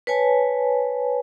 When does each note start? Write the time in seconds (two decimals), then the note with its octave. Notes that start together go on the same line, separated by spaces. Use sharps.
0.07 B4 C#5 G#5 A5